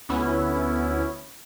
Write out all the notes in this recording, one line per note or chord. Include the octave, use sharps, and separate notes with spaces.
D2 B3 C#4 E4